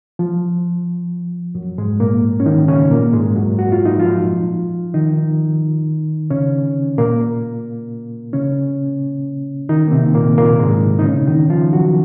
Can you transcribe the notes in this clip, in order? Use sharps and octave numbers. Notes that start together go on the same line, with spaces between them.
F3
F#2 F#3
G#2 G#3
A#2 A#3
C#4
D#3 D#4
C#3 C#4
A#2 A#3
G#2 G#3
F#2 F#3
F#4
F4
D#4
F3 F4
D#3 D#4
C#3 C#4
A#2 A#3
C#3 C#4
D#3 D#4
A#3
C3 C4
A#2 A#3
A#2 A#3
G#2 G#3
D#4
C#3 C#4
D#3 D#4
F3 F4
F#3 F#4